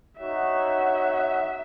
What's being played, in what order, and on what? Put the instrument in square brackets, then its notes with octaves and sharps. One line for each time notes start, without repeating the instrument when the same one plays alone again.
[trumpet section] D#4 F#4 C#5 F#5 [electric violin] E5